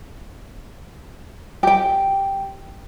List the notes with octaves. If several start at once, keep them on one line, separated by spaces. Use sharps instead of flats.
G4 G5